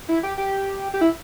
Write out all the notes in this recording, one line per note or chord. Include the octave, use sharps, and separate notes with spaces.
E4
G4
G4
G4
E4